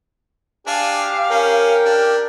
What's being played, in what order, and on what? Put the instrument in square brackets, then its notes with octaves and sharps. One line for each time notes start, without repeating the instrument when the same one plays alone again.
[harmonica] D4 G#5 [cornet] G4 [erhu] F5
[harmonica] C#4 [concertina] A#4 G5
[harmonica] D4 [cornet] G4